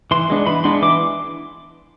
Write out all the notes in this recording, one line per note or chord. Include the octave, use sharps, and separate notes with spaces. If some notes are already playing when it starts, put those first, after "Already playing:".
E3 C6
G#3 B3 D4
E3 B5
G#3 B3 D4 C6
E3 D6